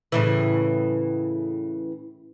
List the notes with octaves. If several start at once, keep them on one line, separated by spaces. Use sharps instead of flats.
A2 C#3 E3